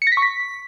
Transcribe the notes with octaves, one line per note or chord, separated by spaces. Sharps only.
C#7
A#6
B6
C#6
B6